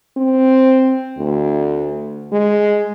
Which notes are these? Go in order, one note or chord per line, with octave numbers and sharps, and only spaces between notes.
C4
D2
G#3